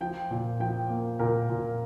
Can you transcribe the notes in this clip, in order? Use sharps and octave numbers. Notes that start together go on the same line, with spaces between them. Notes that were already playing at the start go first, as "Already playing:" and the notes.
F3 G5
A#2
F3 G5
A#3
A#2 A#4
A#2